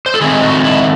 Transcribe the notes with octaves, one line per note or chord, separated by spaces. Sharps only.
C5
A4
D#3 A3 C4 D#4 G#4
F#4
E4